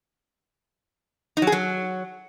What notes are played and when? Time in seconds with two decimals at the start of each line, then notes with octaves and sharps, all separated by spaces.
1.37 D#4
1.42 F#3
1.47 G#4
1.52 F#3